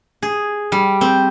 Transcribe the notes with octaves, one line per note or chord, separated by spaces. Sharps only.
G#4
G3
C4